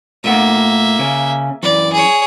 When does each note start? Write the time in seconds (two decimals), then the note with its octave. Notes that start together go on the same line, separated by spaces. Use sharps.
0.24 A#2 A3 A#3 E5 F#5
0.99 C#3 C#4
1.63 F#2 E3 D5
1.93 G#4 C#5